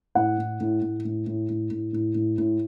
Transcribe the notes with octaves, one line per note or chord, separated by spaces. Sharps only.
A2 F#5
A2
A2
A2
A2
A2
A2
A2
A2
A2
A2